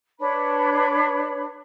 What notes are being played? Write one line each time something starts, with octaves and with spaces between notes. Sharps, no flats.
D4 B4 C#5 B5